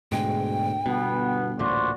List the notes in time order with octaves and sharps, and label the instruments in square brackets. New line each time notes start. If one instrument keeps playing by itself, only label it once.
[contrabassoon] D2 [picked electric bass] G#2 B2 G#3 [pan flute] G5
[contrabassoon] G1 [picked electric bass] B2 [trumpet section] B3
[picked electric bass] A1 D2 A#2 [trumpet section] F#4 C5 D5